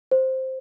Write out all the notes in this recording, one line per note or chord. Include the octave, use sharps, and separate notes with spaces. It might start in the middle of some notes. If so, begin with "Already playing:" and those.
C5